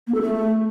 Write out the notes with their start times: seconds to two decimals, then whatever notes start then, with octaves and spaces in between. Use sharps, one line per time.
0.07 A#3
0.14 A4
0.21 A3